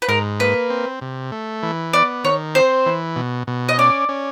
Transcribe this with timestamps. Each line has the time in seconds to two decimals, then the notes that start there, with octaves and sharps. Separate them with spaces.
0.02 B4
0.08 G#2 A#4
0.40 A#3 B4
0.70 C4
1.01 C3
1.32 A3
1.63 E3
1.93 B3 D5
2.24 D#3 C#5
2.55 C4 C5
2.86 E3
3.16 B2
3.47 B2
3.69 D#5
3.78 C#4 D5
4.09 C#4